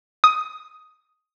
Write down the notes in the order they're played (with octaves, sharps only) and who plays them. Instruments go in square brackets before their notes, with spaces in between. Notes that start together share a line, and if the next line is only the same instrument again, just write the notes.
[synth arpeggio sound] D#6